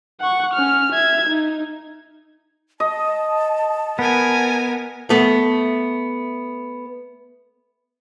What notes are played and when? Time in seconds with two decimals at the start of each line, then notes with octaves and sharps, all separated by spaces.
0.20 F#5 C#6
0.54 C#4 F6
0.92 E5 G#6
1.30 D#4
2.80 D#5 A5
3.99 B3 A#4 G#5
5.10 A3 B3